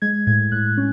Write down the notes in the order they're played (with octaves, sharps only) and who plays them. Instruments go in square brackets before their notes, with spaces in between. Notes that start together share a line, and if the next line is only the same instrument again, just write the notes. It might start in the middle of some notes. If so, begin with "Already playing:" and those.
[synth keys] G#3 G#6
A2 G#6
A2 F#6
C#4